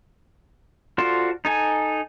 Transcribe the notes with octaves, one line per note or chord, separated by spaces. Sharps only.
F4 F#4 A4 C5 D5
D#4 A4 G#5